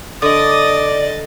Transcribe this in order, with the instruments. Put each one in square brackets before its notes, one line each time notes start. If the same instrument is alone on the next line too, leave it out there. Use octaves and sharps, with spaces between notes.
[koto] D3 [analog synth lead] D5 [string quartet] D#5 A6 [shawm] D#6